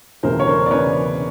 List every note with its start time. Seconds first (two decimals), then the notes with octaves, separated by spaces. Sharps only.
0.23 E1 D2 C#3 E3 A#4 C5
0.40 C#5
0.47 A#4 C5
0.66 D5
0.70 C#3 E3 B4 C#5